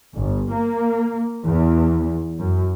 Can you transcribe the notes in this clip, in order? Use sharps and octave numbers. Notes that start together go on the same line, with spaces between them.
G1
A#3
E2
F#2